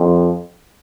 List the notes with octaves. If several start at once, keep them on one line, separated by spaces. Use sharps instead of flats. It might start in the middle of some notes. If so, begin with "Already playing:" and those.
Already playing: F2